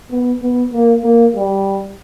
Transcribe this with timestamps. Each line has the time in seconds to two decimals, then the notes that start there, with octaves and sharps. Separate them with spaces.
0.11 B3
0.42 B3
0.73 A#3
1.04 A#3
1.36 G3